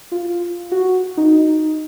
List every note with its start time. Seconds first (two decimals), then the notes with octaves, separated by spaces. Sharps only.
0.12 F4
0.72 F#4
1.17 D#4